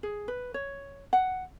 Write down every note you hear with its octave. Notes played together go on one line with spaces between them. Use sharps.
G#4
B4
C#5
F#5